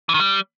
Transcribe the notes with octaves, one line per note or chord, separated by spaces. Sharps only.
E3
D#3
G3